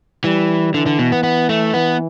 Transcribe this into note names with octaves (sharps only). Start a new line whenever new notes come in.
E3 G3
D3 E3
D3
B2
B3
B3
A3
E3 B3